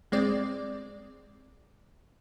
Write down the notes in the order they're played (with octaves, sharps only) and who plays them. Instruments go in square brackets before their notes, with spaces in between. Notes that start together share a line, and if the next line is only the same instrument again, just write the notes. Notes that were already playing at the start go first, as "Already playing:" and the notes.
[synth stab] G1 G#3 C4 D5